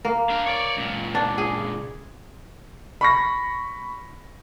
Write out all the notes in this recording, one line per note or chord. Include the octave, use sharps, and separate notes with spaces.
A#3
D4 F5
C#5 D5
C#2 A#2
D4
G#4
B5 C#6 A#6